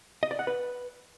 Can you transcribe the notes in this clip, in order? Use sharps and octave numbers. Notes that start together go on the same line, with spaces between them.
D#5
D5
F#5
B4